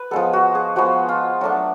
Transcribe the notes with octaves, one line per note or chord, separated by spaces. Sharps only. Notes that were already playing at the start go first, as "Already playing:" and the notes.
Already playing: B4
F3 G#3 B3 A4
F#4
G#4
F3 G#3 B3 F#4
F4
F#3 A3 D4 F#4